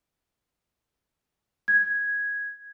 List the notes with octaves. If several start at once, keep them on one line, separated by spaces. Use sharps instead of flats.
G#6